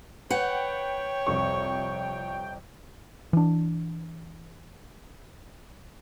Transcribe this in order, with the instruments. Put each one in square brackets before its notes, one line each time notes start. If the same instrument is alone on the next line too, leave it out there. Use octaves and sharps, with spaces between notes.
[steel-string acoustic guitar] B4 F#5 [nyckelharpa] C#5 [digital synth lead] G5
[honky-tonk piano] C2 F2 C#6
[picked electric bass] E3 D4